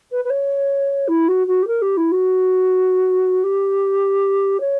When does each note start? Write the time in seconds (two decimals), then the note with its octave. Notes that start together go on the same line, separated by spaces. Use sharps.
0.11 B4
0.24 B4
0.30 C#5
1.07 E4
1.28 F#4
1.47 F#4
1.62 G4
1.67 A#4
1.81 G4
1.97 E4
2.11 F#4
3.43 G4
4.60 C#5